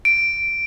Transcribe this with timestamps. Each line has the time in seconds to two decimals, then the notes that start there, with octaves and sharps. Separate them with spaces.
0.05 D7